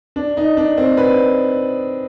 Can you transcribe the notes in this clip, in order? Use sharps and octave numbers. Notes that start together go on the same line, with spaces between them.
D4
D#4
D4
C4
B4